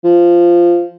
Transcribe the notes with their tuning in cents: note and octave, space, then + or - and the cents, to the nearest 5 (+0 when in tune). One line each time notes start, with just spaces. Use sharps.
F3 -10